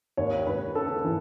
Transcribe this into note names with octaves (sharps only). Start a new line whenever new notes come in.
D#2 C#5
D#2 B4
C#3 A4
E3